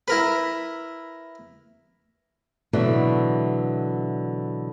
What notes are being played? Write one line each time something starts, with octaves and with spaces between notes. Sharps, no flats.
E4 A#4 B4
B2 D3 E3 F#3 A3